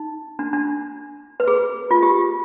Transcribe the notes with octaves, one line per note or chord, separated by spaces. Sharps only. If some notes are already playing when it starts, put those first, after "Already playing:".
Already playing: D#4
D4
D4
B4
G#4
F4
G4